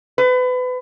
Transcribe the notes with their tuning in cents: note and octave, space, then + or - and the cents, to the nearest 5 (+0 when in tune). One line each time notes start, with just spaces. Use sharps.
B4 +30